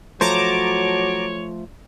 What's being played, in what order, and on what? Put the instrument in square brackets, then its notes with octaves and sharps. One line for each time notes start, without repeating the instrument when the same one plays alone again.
[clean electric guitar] F3 A3 C5 [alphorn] F#3 [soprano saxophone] C#5 [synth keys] A5 A#5 D6